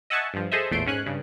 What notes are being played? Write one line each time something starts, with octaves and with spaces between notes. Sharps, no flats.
D#5 E5 F#5 G#5 A5 C#6
G2 F3
G#4 A4 C5 D#5 E5
A1 E2 A#2 A3 C6 D7
G#2 C#4 G#5 F#6
G2 C#3